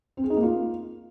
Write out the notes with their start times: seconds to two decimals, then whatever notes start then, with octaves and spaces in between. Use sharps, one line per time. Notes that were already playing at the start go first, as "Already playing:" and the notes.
0.17 C4
0.24 G#4
0.30 D#4
0.36 A#3
0.43 F4